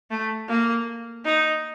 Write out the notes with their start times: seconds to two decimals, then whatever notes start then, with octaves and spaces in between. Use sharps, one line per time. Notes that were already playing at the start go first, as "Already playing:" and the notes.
0.10 A3
0.48 A#3
1.25 D#4